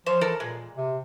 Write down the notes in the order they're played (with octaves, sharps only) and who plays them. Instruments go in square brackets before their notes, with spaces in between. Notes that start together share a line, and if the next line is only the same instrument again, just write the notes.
[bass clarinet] F3 [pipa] C5 C#5
[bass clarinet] E3 [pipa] A4 A#4
[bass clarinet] A#2 [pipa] G#3
[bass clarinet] C3